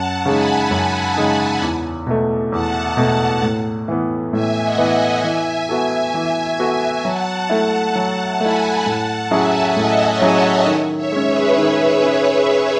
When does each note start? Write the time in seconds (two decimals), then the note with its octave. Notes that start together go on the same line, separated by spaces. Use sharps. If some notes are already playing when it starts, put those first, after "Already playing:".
Already playing: F#2 F#5 A5
0.25 C#3 G#3 D#4 G#5 B5
0.71 F#2 F#5 A5
1.16 C#3 G#3 D#4 G#5 B5
1.62 E2
2.07 B2 A3
2.52 E2 F#5 A5
2.97 B2 A3
3.42 A2
3.88 E3 B3
4.33 A2 E5 G#5
4.63 D#5 F#5
4.78 E3 B3
4.93 E5 G#5
5.24 E3
5.69 B3 F#4 A4
6.14 E3
6.59 B3 F#4 A4
7.05 F#3 F#5 A5
7.50 A3 E4
7.95 F#3 F#5 A5
8.40 A3 E4 G#5 B5
8.86 A2 F#5 A5
9.31 F#3 C#4 E4 G#4 E5 G#5
9.76 A2 D#5 F#5
10.06 C#5 E5
10.22 F#3 C#4 E4 G#4
10.37 C#5 E5
10.67 D#3
10.97 C#5 E5
11.12 G#3 C#4
11.27 G#4 B4
11.57 D#3 G#4 B4
12.03 C#4